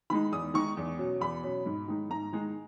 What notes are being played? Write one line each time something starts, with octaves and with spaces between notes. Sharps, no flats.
D#3 G#3 D#4 B5
E2 D#6
D#3 G#3 D#4 C#6
E2
B2 F#3 C#4
E2 B5
B2 F#3 C#4
G#2
D#3 G#3 D#4
G#2 A#5
D#3 G#3 D#4